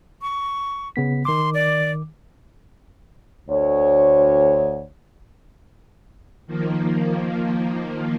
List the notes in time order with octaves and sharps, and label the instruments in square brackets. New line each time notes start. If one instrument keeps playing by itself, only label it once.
[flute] C#6
[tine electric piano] C#3 B3 B6
[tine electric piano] D#3 D6 [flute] C6
[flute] D5
[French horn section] D2 C#5
[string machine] D#3 F3 A#3